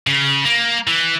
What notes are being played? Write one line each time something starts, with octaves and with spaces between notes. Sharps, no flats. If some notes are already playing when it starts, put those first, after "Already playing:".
C#3
A#3
E3